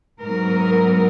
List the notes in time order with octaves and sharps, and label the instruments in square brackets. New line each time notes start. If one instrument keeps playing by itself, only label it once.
[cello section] G#2 F#3 B3 A#4